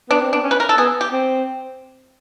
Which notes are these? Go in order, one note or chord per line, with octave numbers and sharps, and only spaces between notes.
B3 D4
C4
B3 D4
C#4
B4
A#4
A4
B3 G#4
G4
C4